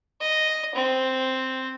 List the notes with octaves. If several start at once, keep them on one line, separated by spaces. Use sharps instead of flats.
D#5
C4